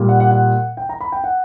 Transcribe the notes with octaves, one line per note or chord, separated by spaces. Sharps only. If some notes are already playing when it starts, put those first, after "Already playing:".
Already playing: A#2 G3
F#5
F#5
F#5
G5
A#5
B5
G5
F#5